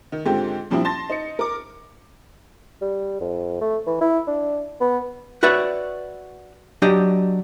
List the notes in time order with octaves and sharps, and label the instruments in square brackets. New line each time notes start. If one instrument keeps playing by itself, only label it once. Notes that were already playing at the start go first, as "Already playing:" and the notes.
[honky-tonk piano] D#3
G#2 D3 C4 F4 G4
A#2 F3 G3 C4 D4 E4
A5 C6 A6 A#6
D#4 C#7
A#4 D6
[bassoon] G3
F2
A3
E3
E4
D4
B3
[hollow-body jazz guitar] F#4 B4 C#5 D5 E5
F#3 D4 G4 D#5